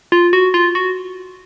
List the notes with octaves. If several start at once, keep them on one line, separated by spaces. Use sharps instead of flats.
F4
F#4
F4
F#4